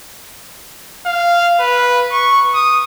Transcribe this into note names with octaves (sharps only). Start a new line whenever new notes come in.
F5
B4
C#6
D#6